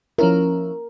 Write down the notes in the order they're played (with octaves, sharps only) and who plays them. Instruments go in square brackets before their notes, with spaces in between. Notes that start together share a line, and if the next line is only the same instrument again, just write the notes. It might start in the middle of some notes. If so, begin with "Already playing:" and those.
[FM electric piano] F3 C#4 E4 [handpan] A#4